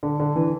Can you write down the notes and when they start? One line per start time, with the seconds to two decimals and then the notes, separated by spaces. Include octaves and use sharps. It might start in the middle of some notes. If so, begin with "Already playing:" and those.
0.03 D3
0.20 D3
0.36 E3